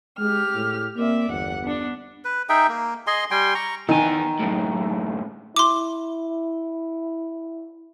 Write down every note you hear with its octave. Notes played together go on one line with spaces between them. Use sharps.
G#3 G4 F6
A2
A#3 C4 D5 E5
G1 E2 F#5
B3 D4
B4
D#4 G#4 E5 G5
A#3
G#4 D#5 G#5 C6
G3 G5 G#5 C6
A#5 C#6
E2 D#3 G#5
F#2 A2
E4 C6 D6